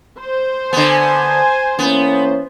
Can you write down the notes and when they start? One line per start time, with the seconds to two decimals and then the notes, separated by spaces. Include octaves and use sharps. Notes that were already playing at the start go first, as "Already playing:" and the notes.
0.19 C5
0.73 D3 B3 G#5
1.79 E3 A#3 B3 C#4